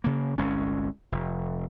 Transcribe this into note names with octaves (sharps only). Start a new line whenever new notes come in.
C#3 A#3
G1 C2 G#3 C#4
F1